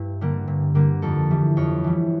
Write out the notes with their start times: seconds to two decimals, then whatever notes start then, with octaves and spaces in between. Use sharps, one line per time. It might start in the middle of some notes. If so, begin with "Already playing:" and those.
Already playing: G2 E4 G4
0.21 D3 G3 A#3
0.48 G2
0.75 D3 G3 A#3
1.02 F2 A4
1.31 E3 G3
1.57 F2 C#5
1.84 E3 G3